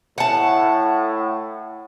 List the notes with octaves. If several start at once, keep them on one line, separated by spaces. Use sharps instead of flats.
A2 F#5 A5